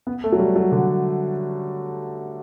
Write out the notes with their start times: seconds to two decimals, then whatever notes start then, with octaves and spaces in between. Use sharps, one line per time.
0.07 B3
0.24 A3
0.32 F#3
0.39 G3
0.56 F#3
0.72 D3